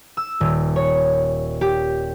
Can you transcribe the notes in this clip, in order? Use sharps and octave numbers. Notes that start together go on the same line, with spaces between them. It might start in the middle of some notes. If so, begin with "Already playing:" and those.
E6
D#1
C#5
G4